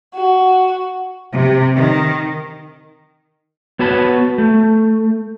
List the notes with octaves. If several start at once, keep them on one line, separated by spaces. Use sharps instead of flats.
F#4
C3
D#3
B3 F#4 C#5 A5 B5
A3